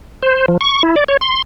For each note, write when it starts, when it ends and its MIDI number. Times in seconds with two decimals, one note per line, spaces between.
0.23 0.46 72
0.48 0.57 53
0.61 0.83 85
0.83 0.95 64
0.96 1.04 74
1.08 1.17 73
1.21 1.42 84